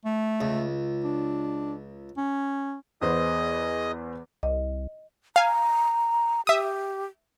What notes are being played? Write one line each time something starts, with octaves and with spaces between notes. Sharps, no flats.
A3
C#2
D4
C#4
E2 B3 G#4 C5 D#5 D#6
C2 D#5
F5 G#5 A#5
G4 E5 D#6